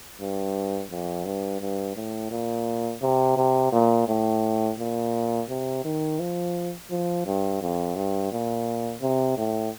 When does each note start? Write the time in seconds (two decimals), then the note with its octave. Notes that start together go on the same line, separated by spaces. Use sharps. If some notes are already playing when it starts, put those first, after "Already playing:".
0.20 G2
0.91 F2
1.25 G2
1.61 G2
1.96 A2
2.31 A#2
3.02 C3
3.37 C3
3.72 A#2
4.08 A2
4.79 A#2
5.49 C3
5.85 D#3
6.20 F3
6.91 F3
7.26 G2
7.62 F2
7.96 G2
8.32 A#2
9.02 C3
9.38 A2